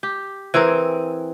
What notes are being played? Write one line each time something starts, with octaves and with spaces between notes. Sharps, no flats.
G4
E3 C4 G#4 A#4